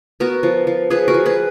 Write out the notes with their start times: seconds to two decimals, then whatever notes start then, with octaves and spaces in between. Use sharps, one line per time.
0.20 B3 F#4 A#4
0.43 F3
0.67 F3
0.90 F3 G#4 B4
1.08 F#4 A#4
1.14 F3
1.26 G#4 B4